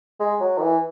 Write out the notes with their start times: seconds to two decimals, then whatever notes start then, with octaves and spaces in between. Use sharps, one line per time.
0.20 G#3
0.40 F#3
0.58 D#3
0.62 E3